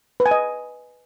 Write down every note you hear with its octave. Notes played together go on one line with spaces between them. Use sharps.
B4
G#5
D#5